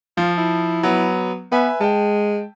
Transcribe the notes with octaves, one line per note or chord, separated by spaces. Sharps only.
F3 F4
E4
F#3 B3
B3 B4 E5 G#5
G#3 G5 A5